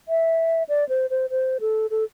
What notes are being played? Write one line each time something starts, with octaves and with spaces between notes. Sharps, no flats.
E5
D5
C5
C5
C5
A4
A4